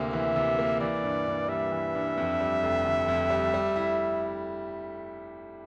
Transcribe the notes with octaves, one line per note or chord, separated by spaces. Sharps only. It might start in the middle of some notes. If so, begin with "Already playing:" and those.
Already playing: D2 C3 A#3
E3 E5
C3
A#3
E3 D5
G2
G2
G3 E5
E3
G2
F2
G3
F1
D3
F2
G3
G3
E4